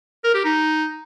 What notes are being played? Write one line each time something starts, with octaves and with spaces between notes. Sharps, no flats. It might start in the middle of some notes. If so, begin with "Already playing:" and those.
A#4
G4
D#4